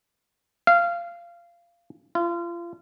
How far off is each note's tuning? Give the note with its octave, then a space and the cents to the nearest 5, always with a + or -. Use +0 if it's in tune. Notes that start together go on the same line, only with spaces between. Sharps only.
F5 -20
F4 -35